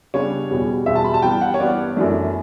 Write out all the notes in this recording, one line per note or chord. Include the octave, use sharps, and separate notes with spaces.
C#3 G3 B3 D4 C#5
E2 B2 G3
E2 B2 G3 E5
A5
B5
A5
G2 E3 B3 G5
F#5
C#5
G2 E3 B3 D5
F#2 E3 A3 D4